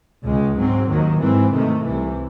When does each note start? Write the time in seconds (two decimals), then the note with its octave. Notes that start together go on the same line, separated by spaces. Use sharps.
0.24 C#2 C#3 G#3
0.56 G#2 F#3 C4
0.88 D#2 D#3 F#3
1.20 G#2 E3 C4
1.51 C3 D#3 A3
1.83 C2 C3 E3